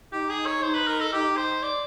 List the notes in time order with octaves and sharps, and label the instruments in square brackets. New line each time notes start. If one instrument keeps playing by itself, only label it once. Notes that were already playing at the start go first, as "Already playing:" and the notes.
[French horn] D#4 [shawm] G4
[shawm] G#4
C#5
[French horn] D#4 [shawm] C5
[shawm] B4
A#4
A4
[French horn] D#4 [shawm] G4
[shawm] C5
D5